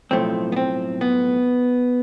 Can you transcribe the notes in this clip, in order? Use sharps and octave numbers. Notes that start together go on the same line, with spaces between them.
B1 A2 F3 A3 C4
B3
C4
B3